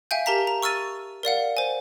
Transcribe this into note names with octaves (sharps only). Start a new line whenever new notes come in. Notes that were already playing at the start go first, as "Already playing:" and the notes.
E5 F5 G5 G#5 G6
G4 A#4 A5 A#5 B6
A#5
C#6 E6 F6 A6 D#7
A#4 D5 F5 F#5
C5 G#5